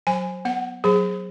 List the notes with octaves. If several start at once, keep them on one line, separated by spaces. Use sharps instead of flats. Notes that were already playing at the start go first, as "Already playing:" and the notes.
F#3 G#5
B3 F#5
F#3 G#4